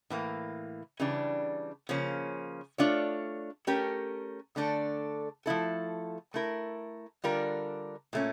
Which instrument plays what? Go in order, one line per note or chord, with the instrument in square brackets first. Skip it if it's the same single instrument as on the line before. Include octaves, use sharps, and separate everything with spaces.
[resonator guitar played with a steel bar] A2 E3 A#3
C#3 E3 G3 D4
C#3 F3 A#3 C#4
A3 D4 F4 C#5
A3 C#4 G4 A#4
D3 A3 D4 A4
F3 A3 E4 A4
A3 E4 A#4
D3 G3 D4 F4 A#4
A#2 A3 C#4